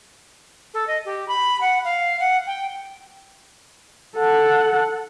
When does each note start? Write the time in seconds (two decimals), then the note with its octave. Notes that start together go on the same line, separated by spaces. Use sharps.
0.74 A4
0.87 D#5
1.05 G4
1.28 B5
1.61 F#5
1.84 F5
2.20 F#5
2.47 G5
4.16 A4 F#5